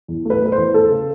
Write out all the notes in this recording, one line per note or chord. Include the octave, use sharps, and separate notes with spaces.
E2
A3 B4
A3 B4
C5
E2
A3 A4
C#3